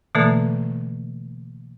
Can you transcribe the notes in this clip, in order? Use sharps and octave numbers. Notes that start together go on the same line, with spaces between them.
B2 D3 E3 A3 A#3 A4